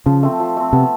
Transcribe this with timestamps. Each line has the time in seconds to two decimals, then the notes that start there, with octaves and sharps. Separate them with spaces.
0.06 C#3 F3
0.23 A3 C4
0.40 F3
0.57 A3 C4
0.73 C3 B3